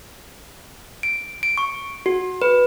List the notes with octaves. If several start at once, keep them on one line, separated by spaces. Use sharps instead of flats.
D7
D7
C#6
F#4
B4